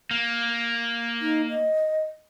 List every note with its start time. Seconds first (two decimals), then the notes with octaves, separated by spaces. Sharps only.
0.11 A#3
1.21 D#4
1.50 D#5